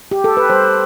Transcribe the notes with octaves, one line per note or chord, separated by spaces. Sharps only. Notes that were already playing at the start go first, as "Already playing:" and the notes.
G4
A4
B4
G3 C5